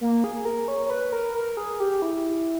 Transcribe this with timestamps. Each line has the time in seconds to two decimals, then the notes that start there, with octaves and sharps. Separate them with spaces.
0.01 A#3
0.24 G#4
0.45 A#4
0.68 C#5
0.86 C#5
0.90 B4
1.12 A#4
1.34 A#4
1.57 G#4
1.80 G4
2.02 E4